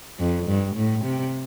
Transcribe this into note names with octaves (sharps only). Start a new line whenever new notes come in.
F2
G2
A2
C3